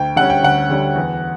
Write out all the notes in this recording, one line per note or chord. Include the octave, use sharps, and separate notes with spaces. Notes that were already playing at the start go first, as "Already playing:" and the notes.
Already playing: D2 G5
D3 G3 C#4 F#5
G5
D2 F#5
D3 G3 C#4
E2